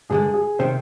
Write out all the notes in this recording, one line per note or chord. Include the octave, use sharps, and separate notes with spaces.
G2 D3 G#3 G#4
G#4
C3 D#3 C5